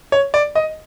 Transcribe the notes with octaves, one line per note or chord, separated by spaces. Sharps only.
C#5
D5
D#5